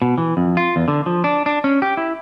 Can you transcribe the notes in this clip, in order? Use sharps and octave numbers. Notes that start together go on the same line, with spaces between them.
B2
E3
F2
F4
E2
D3
F3
D4
D4
C#4
G4
E4